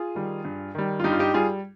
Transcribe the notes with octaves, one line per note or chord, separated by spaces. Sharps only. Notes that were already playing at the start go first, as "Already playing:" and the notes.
Already playing: F4 G#4
D#3 G3
G2
D#3 G3
F4
G2 D#4 G4
F4
D#4 G4
G3 F4 G#4